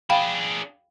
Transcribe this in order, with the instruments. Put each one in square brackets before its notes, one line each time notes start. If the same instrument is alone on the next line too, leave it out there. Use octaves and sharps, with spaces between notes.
[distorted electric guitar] D4 G#4 [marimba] F5 G5 B5